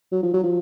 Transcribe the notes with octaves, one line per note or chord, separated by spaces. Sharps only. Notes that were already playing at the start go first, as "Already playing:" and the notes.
F#3
F3
F#3
F3